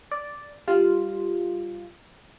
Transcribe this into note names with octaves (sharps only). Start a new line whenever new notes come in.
D5
G3 F4